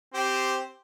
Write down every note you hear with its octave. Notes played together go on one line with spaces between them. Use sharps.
C4 G4 C5